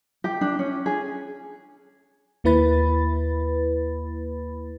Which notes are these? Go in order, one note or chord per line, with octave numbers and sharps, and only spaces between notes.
G4
D4
C#4
G#4
D#2 A#3 E4 B4 B5 A6